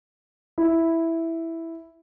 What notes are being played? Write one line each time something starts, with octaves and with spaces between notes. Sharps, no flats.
E4